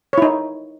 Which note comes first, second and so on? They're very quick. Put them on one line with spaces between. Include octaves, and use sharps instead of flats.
C#5 E4 D#4